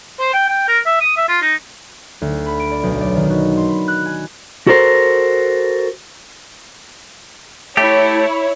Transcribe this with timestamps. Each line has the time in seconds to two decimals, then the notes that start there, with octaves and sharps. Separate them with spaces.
0.19 C5
0.34 G5
0.49 G5
0.68 A#4
0.86 E5
1.01 D#6
1.17 E5
1.29 F4
1.42 D#4
2.22 D2
2.46 B5
2.60 D7
2.72 D5
2.83 B1
3.01 D5
3.16 D#3
3.30 F#4
3.57 C6
3.69 B5
3.88 F#6
4.06 G#5
4.67 F#4 A4 A#4 C5
7.77 A3 E4 G4 C#5